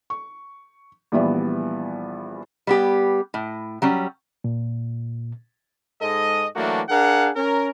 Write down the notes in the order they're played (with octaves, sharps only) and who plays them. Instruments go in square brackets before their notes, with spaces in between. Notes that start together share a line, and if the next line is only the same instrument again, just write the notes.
[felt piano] C#6
A#1 E3 G3 B3 D5 E5
[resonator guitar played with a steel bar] G3 B3 G4
A2
F#3 G3 C#4
[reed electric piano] A#2
[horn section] G#2 G#3 A4 D#5
E3 F#3 A3 A#3 D4 F#4
D4 G#4 A#4 F5 F#5
C#4 A#4